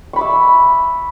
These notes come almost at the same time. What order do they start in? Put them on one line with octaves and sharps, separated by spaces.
C#6 B5 D6 E5